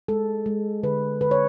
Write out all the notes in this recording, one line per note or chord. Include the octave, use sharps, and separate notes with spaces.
G#3 A4
G#3
D3 B4
D3 B4
C#5